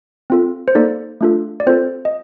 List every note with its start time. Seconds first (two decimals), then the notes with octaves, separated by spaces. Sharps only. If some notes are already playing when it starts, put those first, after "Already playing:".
0.30 C4 F4 A4
0.68 C5
0.75 A#3 D#4 A4 D5
1.21 A3 D4 F4 A4
1.60 D5
1.67 C4 F4 A4 C5
2.05 D#5